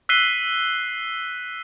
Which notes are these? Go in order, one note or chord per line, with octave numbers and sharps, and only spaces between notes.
E6 F#6 B6 C7 D#7 G7